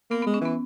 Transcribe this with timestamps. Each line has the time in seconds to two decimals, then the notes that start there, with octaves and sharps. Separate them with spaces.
0.11 A#3 B3
0.22 B3
0.26 G#3
0.34 C#4
0.41 E3 B3